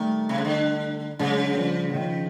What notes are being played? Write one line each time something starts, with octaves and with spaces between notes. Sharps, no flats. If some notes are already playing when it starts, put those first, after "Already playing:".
Already playing: D#3 G3 A3
C3
C#3
D3
C#3 F#3 G#3
F3 G3
F#3
D#3 F3